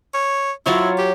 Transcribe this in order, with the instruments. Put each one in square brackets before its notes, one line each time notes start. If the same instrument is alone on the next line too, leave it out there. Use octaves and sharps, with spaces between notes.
[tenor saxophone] C#5
[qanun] F#3 F4 C#5 [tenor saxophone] E4
[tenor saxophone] G4